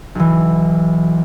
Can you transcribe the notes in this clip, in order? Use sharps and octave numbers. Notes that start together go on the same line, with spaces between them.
B1 E3